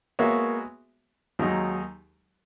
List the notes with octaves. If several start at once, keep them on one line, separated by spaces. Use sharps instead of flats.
G#3 A#3 B3 F#4 C#5 E5
D#2 D#3 F#3 G#3 D#4